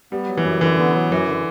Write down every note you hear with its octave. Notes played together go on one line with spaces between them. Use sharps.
G3 B3
F#3
E3
F#2
D3 E3
B3
F#3
F#2 E3
D3